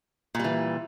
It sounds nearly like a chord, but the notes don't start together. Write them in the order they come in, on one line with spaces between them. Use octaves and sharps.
A#2 G3 E3